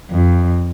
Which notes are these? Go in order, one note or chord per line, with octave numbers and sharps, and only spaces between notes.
F2